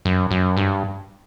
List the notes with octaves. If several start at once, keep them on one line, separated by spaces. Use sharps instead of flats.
F#2
F#2
G2